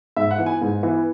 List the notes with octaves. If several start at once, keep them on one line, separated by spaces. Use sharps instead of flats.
G#2 E5
F#5
E3 B3
G#5
G#2
E3 B3